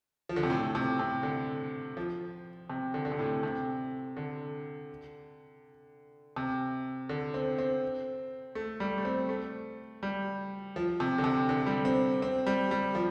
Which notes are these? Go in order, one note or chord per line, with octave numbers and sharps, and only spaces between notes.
F3
D3
C3
A2
C3
C3
D3
F3
C3
D3
D3
C3
A2
C3
D3
C3
D3
C4
C4
A3
G3
A3
C4
A3
G3
F3
C3
D3
C3
D3
G3
C4
C4
G3
G3
F3